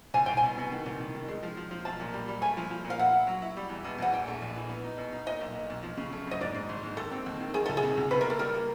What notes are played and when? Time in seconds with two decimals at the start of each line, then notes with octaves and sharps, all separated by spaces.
0.14 C2 G#5
0.26 C2 G5
0.37 G#5
0.43 B2
0.58 B2
0.72 D#3
0.86 C2
1.00 D#3
1.15 D#3
1.28 G#3
1.43 F3
1.57 F3
1.71 F3
1.85 B1 A5
2.00 A#2
2.14 G3
2.28 G3
2.42 A3 G#5
2.57 F3
2.70 F3
2.84 A#2
2.90 F5
2.99 E4 F#5
3.13 E4
3.27 F#3
3.42 E4
3.57 G3
3.70 E2
3.84 B2
3.98 E2 F#5
4.12 A#1 G5
4.27 A3
4.42 A#1
4.56 E3
4.69 B3
4.84 D#4
4.98 B2
5.12 D#4
5.27 A#2 D#5
5.41 B1
5.55 B1
5.70 B1
5.83 F3
5.97 C#3
6.13 A3
6.27 F#2 D#5
6.41 G#2 D5
6.55 G#2
6.69 G#1
6.83 G#2
6.97 D#3 A4
7.11 C4
7.26 D#2
7.41 D#3
7.54 D#3 G#4
7.66 C#2 A4
7.77 G#4
7.83 C3
7.97 C#2
8.11 B2 B4
8.21 A#4
8.25 A#3 A4
8.39 G3 A#4
8.55 A#3